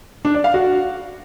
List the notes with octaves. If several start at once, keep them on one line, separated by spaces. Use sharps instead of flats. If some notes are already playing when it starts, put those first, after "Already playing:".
D4
D5
F5
F#4